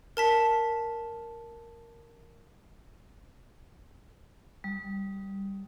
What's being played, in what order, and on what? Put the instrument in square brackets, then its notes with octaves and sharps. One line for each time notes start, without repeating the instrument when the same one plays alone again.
[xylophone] A#4 A5 B6
[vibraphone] G3